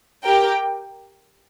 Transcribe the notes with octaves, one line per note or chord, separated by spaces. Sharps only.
G4 A#4 G5